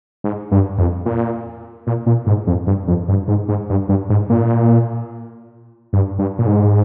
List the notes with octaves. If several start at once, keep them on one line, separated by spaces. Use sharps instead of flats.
G#2
G2
F2
A#2
A#2
A#2
G#2
F2
G2
F2
G2
G#2
G#2
G2
G2
G#2
A#2
G2
G2
A#2
G#2